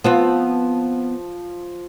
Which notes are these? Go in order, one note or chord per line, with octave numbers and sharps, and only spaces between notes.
F3 B3 C4 F4